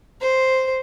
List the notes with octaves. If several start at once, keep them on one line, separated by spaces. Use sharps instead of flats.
C5